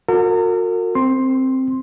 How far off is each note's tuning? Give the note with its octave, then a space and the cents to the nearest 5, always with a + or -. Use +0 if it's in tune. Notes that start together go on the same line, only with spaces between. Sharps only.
F#4 -35 A#4 -40
C4 +0 C6 +10